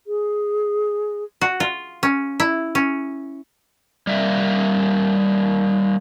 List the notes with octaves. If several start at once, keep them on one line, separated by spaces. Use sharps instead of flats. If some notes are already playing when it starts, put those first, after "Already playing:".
G#4
F#4
F4
C#4
E4
C#4
G3 A#3 E5